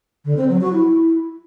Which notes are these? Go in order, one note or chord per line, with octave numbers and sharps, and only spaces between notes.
D3
C4
F#3
F#4
E4